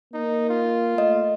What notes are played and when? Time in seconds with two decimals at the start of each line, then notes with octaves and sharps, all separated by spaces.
0.14 A#3 D#4
0.49 F4
0.98 A3 D#5